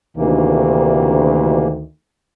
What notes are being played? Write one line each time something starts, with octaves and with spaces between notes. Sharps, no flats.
D2 C3 D#3 E3 A#3